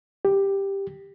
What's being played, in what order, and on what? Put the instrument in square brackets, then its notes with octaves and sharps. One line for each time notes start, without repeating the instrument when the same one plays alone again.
[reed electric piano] G4